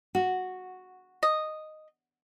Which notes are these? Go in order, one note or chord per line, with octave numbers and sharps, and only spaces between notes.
F#4
D#5